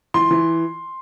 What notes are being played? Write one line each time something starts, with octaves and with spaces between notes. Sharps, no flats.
E3 C6
E3